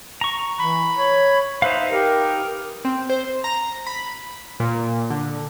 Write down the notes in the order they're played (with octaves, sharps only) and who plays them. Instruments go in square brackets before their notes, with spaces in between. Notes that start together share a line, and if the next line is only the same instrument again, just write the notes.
[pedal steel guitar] A#5 C#6
[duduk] E3 [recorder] B5
[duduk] C#5
[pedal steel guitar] D#4 B4 F5 [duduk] C5 [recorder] E5
[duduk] G4 [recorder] A#4
[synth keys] C4
C5
A#5
B5
A#2
D3